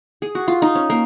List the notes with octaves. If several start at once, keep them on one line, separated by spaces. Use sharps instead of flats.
G#4
F#4
F4
D#4
C#4
A#3